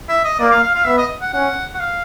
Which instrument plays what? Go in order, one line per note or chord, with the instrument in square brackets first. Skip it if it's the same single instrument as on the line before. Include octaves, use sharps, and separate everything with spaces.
[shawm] E5
D#5
[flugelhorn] A#3 [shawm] D5
[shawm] F5
F5
F5
[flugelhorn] B3 [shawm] E5
[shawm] D#5
F#5
[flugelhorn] C#4 [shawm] F#5
[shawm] F#5
F5